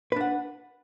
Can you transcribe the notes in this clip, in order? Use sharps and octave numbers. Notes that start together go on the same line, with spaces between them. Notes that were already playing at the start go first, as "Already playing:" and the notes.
D4 B4 F#5